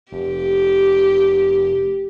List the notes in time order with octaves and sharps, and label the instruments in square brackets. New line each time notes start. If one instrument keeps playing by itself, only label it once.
[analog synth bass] F1 [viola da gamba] G4